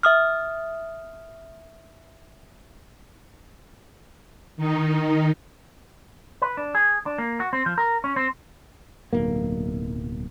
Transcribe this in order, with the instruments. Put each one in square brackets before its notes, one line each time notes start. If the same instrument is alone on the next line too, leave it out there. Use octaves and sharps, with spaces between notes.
[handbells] E5 D#6 F6
[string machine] D#3 D#4
[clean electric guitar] B4
D4
G#4
D4
A#3
F#4
C4
F3
A#4
C#4
C4
[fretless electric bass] D1 B1 A#3